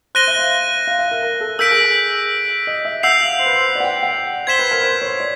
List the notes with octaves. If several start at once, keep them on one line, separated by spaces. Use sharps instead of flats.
C5 F#6 A#6 D#7 G7
E5
F5
F5
E5
A#4
A#4
A4
A#4 E6 G6 B6 D7
G#4
D#5
E5
F#5 E6 G6 C7 F7
F5
C5
B4
C5
D5
F#5
G5
F#5
C5 G#6 B6 E7 G7
B4
A#4
C5
C#5
D5